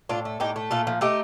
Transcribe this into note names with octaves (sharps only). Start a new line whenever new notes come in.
A2 D4 F4
A3
A2 D#4 G4
A3
A#2 F4 A4
F3
A3 D#4 G4